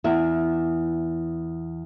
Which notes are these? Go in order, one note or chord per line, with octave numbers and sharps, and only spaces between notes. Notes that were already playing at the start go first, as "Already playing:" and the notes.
E2 E5